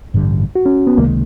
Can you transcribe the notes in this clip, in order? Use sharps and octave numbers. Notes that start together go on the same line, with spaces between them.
A1 G2 D3 G3
F#4
C#4
B3
C#2 C3 D#3 G#3 A#3